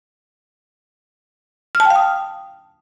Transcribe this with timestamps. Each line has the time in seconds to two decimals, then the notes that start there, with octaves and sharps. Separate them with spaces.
1.75 F6
1.80 A5
1.85 G5
1.90 F5
1.96 D#6